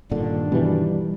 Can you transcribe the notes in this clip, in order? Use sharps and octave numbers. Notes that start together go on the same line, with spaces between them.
G2 A#2 D3 D#3 D4
B2 E3 G3